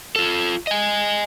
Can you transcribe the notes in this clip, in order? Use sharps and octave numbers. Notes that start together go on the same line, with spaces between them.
F4 A4
D#5 G#5